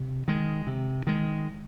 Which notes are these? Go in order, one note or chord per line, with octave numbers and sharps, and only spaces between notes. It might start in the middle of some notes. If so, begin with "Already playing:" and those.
Already playing: C3
D#3 G#3
C3
D#3 G#3